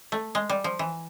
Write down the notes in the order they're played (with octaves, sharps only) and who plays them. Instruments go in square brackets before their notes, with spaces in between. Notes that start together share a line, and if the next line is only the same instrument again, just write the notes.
[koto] A3
G#3
G3
F3
E3